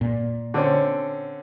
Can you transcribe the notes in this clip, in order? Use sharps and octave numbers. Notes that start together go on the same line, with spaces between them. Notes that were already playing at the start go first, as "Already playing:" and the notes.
A#2
D3 C4 C#4